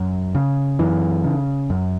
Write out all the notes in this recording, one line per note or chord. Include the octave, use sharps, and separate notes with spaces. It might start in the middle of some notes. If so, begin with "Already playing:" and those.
Already playing: F#2
C#3
F#2 E3
C#3
F#2